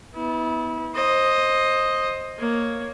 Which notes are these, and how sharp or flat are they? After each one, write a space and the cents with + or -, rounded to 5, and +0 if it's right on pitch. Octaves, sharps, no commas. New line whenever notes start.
B3 +0 E4 -30
C5 +15 D#5 +0
A#3 +0 C#5 +0